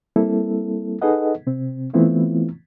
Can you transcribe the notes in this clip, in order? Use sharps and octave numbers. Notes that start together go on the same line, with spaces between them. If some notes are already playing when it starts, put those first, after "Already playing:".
G3 A#3 C4 E4 A4
D#4 G#4 A4 B4 D#5 F#5
C3 C4
E3 A3 B3 C4 E4 F4